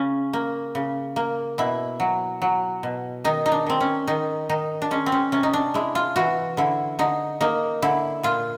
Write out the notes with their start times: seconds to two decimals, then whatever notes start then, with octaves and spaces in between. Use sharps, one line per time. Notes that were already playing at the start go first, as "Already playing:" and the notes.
Already playing: C#3 C#4
0.33 A#3
0.75 C#3
1.16 A#3
1.58 B2 E4
2.00 F#3
2.42 F#3
2.83 B2
3.24 D#3 D#4
3.46 D#4
3.52 D4
3.66 D#3 C4
3.80 C#4
4.07 D#3 D#4
4.49 D#3 D#4
4.82 D4
4.91 G#3 C#4
5.06 C4
5.12 C#4
5.32 C3 C#4
5.43 D#4
5.53 D4
5.74 G#3 E4
5.95 F4
6.16 E3 F#4
6.57 D3 E4
6.99 D3 D#4
7.41 A#3 D#4
7.82 D3 E4
8.23 A#2 F4